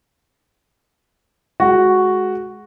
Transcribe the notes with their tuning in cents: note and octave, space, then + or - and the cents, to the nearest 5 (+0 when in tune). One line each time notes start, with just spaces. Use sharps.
G#3 +15 F#4 +0